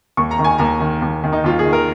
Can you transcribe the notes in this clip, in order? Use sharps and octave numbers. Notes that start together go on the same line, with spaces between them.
D#2 C#6
A#5
D#3
G#5
D#2 A#5
D#3
D#2
D#3
D#4
D#2 F4
G#4
D#3
A#4